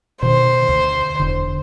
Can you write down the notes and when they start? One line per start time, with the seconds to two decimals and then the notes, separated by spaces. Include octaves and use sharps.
0.23 B2 D#3 C5
0.69 D2
1.20 E1 D3